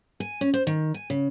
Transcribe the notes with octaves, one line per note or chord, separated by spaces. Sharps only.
G#5
C#4
C5
D#3
G#5
C#3